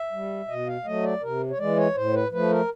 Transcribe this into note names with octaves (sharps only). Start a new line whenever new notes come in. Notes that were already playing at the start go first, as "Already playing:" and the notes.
Already playing: E5
G3
B2 D#5
F5
F#3 A3 D#5
D5
C3 A#4
C#5
E3 G#3 D5
C#5
A2 C5
B4
F3 A3 B4
A#4